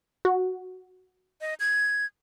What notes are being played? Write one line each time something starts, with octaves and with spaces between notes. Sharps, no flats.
F#4
D#5
G#6